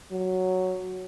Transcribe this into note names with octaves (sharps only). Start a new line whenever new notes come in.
F#3